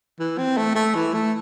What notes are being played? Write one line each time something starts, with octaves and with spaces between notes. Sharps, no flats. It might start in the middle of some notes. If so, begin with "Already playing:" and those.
E3
C4
A3
A3
E3
A3